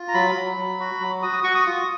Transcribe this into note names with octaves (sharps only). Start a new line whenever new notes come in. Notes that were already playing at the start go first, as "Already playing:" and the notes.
Already playing: F4
A#5
F#3 B5
F#3
F#3
F#4
F#3
F#4 D#6
D#6
F#4 C#6
D#6
F4